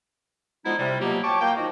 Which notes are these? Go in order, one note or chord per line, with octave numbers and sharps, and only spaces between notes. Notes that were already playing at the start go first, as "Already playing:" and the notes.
D3 F3 G#3 B3 D#4 E4
C3 G3
B2 F3 F#3 A#3 G4
C#5 G5 A5 C#6 D6
A#3 G5
D#3 F3 D#4 F#4